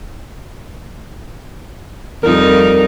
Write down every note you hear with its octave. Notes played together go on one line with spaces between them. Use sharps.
F2 G3 D#4 A#4